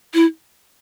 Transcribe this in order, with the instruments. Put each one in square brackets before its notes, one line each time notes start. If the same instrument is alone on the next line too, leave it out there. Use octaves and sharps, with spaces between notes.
[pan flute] E4